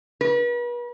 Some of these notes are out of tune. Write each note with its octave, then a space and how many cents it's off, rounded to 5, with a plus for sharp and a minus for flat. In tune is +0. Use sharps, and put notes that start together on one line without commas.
B4 -40